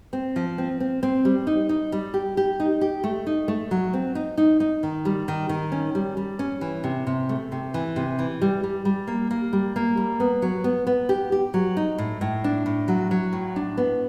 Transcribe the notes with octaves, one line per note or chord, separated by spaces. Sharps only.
C4
F3
C4
C4
C4
G3
D#4
D#4
G3
G4
G4
D#4
G4
A3
D#4
A3
F#3
C4
D#4
D#4
D#4
D#3
G3
D#3
D#3
C#4
G3
G3
C#4
E3
C3
C3
A3
C3
E3
C3
E3
G3
G3
G3
A#3
A#3
G3
A#3
G3
B3
F#3
B3
B3
G4
G4
F#3
D#4
A2
A2
D4
A2
F#3
F#3
A2
D4
B3